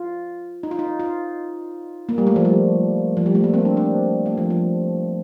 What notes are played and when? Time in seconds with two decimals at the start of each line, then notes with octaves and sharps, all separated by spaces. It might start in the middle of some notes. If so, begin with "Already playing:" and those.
Already playing: F4
0.63 D#4
0.71 F4
0.79 D#4
1.00 F4
2.09 A#3
2.18 G3
2.27 A3
2.36 F3
2.45 G3
3.17 F3
3.26 G3
3.35 A3
3.44 A#3
3.54 C4
3.65 D4
3.77 D4
4.26 A3
4.37 F3
4.50 F3